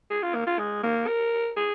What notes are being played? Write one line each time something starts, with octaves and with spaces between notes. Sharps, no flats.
G#4
F4
A#3
F4
G#3
A#3
A#4
G#4